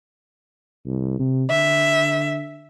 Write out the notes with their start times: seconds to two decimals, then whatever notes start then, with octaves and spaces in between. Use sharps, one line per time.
0.86 C2
1.19 C3
1.50 D3 E5